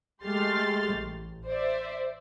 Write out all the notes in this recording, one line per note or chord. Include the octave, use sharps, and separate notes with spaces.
G#3 A3 G4 C6 F6 A6
A1
C5 D5 E5